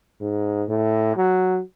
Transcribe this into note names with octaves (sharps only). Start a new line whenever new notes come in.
G#2
A2
F#3